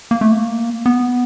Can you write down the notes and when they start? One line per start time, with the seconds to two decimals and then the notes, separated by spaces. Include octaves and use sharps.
0.11 A#3
0.21 A3
0.32 A#3
0.86 B3